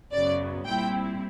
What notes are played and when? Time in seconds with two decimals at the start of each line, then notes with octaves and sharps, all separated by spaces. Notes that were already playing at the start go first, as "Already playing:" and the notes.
0.12 F#2 C#3 F#3 B3 D5
0.66 A#2 G3 C4 E4 G5